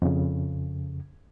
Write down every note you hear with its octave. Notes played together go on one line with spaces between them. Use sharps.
F2 C#3